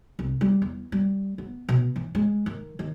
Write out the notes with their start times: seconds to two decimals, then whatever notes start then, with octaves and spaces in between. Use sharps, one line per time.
0.19 C2
0.41 G3
0.62 E2
0.92 G3
1.38 B3
1.69 B2
1.96 E3
2.15 G#3
2.46 D#3
2.79 D#3